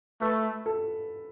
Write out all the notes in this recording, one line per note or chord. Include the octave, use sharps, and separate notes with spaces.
A3 B4
A4